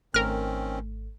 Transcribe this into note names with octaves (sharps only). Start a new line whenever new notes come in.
G#1 D#3 A3 C4 C#4 A#4 F6